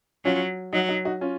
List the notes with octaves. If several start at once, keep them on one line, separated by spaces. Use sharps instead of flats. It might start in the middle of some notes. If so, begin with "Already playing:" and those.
F#3 C#4 F4
F#3 D#4 F#4
D#4 F#4
D#4 F#4
C#4 F4